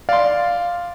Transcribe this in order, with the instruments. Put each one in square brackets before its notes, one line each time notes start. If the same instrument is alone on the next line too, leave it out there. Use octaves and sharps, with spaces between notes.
[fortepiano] D5 C6 [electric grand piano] F5